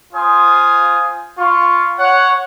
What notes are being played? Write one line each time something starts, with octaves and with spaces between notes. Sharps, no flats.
F4 C5 G#5 D#6
F4 B5 C#6
C#5 F#5